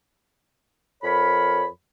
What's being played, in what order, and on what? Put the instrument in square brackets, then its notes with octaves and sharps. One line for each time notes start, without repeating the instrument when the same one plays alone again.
[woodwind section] F2 A#4 C#5 B5